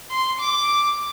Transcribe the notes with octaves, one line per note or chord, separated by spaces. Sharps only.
C6
D6